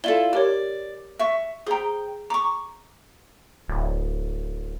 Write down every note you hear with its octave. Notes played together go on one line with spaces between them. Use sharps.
E4 F4 A4 D5 G7
G4 A#4 C#5 D5
E5 C#6
G#4 C5 G5 A#5
A#5 C#6 D6
D1